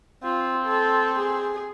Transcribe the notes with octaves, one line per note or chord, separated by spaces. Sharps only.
C4 F4
A4
G#4